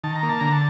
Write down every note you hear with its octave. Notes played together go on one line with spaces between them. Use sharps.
D#3 A5
A#5
A#3
A5
D3 A#5
A5